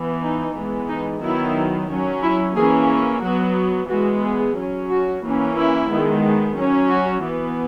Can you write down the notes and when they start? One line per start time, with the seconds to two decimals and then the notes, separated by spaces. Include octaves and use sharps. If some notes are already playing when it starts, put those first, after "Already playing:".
Already playing: E3 B3
0.23 D#4
0.56 E3 G#3 B3
0.89 D#4
1.23 D#3 F#3 B3 E4
1.90 F#3 C#4
2.23 E4
2.56 E3 A#3 C#4 G#4
3.22 F#3 B3 F#4
3.89 E3 G#3 B3 F#4
4.22 G#4
4.57 F#3 C#4
4.90 F#4
5.23 E3 A#3 C#4
5.56 E4
5.90 D#3 G#3 B3
6.57 F#3 C#4
6.89 F#4
7.23 E3 B3